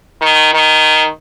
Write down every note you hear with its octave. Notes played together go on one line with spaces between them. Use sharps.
D#3
D#3